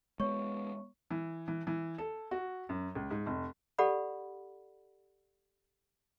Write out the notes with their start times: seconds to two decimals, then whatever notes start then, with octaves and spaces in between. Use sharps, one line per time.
0.20 G#3 B3 C#5 C#6
1.11 E3
1.48 E3
1.67 E3
1.98 A4
2.31 F#4
2.69 F#2
2.95 C#2
3.11 G#2
3.26 F1
3.78 G4 A4 D5 F#5 B5